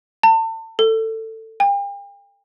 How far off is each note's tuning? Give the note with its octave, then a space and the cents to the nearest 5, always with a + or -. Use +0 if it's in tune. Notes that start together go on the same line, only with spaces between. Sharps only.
A5 +35
A4 +20
G5 +40